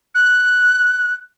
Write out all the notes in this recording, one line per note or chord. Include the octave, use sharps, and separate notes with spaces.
F#6